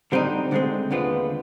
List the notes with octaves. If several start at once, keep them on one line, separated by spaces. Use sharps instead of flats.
D3 G3 C4 D#4
D2 D3 G#3 C4
D#2 D3 G#3 B3 F4